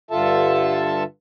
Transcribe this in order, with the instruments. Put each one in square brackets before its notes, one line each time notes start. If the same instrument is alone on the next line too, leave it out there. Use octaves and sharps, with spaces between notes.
[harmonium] G2 D3 F4 A4 E5 A5